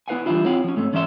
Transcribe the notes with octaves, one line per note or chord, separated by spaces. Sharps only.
B3 E4 B4 F5 F#5 G#5
E3 G3 G#3 D4 E4 F4
C4 E4 F4 C#5 F5 F#5
F3 C#4
G#2 A3 C4 C#4
G#2 E3 C#4 D5 E5 C6